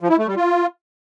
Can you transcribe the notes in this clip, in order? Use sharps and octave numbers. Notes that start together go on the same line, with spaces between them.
F3
E4
A3
G3
F4